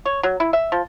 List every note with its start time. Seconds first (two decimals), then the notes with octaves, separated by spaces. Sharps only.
0.05 C#5
0.23 F#3
0.40 E4
0.53 E5
0.72 F3